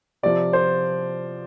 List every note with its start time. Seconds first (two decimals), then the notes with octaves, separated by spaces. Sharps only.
0.23 C3 F3 D5
0.53 C5